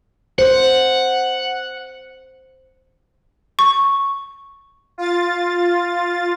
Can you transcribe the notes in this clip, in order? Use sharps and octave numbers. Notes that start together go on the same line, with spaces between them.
C5 F#5
C#6
F4 A6